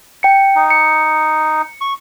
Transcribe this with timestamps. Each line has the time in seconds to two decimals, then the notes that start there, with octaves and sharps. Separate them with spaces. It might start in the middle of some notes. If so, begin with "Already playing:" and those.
0.23 G5 C#7
0.56 D#4
0.70 C#7
1.81 C#6